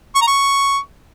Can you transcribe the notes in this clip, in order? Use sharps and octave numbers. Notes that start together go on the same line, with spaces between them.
C#6
A#5
C#6